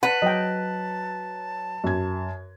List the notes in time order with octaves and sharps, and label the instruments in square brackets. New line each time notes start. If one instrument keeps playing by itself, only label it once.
[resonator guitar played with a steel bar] B4 [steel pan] F#5 [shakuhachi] A5
[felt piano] F#3 [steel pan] D#5 G5
[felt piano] F#2 G#6